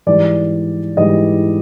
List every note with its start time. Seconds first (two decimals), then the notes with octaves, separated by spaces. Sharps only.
0.06 G#2 E3 G3 D5
0.97 G#2 E3 G3 D#5